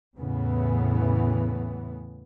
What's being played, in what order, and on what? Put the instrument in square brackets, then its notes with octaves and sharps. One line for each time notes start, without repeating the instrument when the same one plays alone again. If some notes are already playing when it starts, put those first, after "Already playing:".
[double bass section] E2 A2 C#3 E3 B3